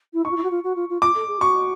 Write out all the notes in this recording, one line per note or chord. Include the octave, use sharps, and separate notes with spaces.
E4
D#4 C#6
F4
E4
F#4
F4
F#4
F4
F4
F4 D6
A4
G#4
F#4 C#6